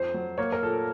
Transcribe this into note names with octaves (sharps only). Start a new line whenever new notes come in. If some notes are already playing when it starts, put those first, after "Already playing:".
Already playing: F2 C5
F#3
A#3 C#5
A#4
A#2 A4